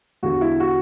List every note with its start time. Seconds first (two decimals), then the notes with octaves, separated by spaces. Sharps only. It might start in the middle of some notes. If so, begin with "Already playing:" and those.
0.23 E2 D3 F#4
0.41 E4
0.60 F#4